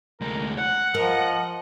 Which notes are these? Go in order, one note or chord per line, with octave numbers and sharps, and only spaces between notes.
D2 G#3 A#4
F#5 F#6
F3 A#4 D#5